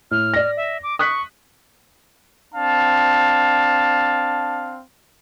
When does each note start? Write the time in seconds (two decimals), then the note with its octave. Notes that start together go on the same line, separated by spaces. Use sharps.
0.11 A2 F6
0.34 D5 A#6
0.57 E5
0.83 D6
0.99 C#6 D#6 F#6 B6
2.55 C4 D4 F5 A5